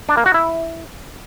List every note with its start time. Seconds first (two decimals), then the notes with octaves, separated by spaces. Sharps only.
0.09 D4
0.17 A#3
0.26 F#4
0.34 E4